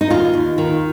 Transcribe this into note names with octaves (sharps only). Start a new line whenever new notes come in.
D#4
D#2 F4
D#2
D#3